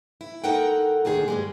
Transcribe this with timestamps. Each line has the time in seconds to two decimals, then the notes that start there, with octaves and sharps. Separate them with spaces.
0.21 E4
0.44 F#2 D#4 A4 A#4 F#5 G5
1.05 D2 A#2 D#3 D4 G#4
1.28 G2 G3 G#3